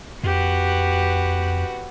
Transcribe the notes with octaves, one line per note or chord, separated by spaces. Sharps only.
F2 F#4 G4 B4